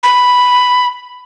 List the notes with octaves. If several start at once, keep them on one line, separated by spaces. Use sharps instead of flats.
B5